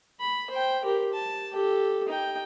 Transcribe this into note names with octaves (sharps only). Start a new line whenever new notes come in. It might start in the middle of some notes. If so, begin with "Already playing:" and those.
B5
C5 G5
G4 A#4
A5
G4 A4
D#4 G5